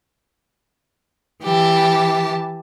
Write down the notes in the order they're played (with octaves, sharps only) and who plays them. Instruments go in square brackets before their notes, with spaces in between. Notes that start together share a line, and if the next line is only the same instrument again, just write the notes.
[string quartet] E3 G4 A5